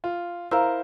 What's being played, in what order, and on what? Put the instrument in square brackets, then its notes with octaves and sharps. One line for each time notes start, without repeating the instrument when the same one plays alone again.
[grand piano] F4
[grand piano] E4 A#4 C5 [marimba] F5 A#5 E6